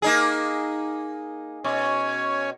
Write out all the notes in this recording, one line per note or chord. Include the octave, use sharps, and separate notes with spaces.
A#3 D#4 G#4
B2 C#4 C#5 G#5